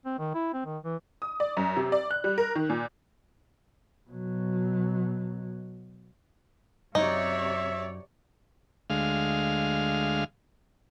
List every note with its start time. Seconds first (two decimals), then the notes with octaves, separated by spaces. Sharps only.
0.06 C4
0.19 D#3
0.35 E4
0.54 C4
0.66 D#3
0.84 E3
1.22 D#6
1.40 D5
1.57 F#2
1.77 C3
1.92 D5
2.11 F#6
2.24 G3
2.38 A#4
2.55 D#3
2.70 A#2
4.10 B2 F#3
6.95 F#2 C3 D#4 C#5 D5 E5
8.90 D2 G#3 F5